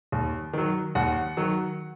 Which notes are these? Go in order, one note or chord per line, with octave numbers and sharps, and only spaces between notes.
D#2
D#3 F#3
D#2 F#5
D#3 F#3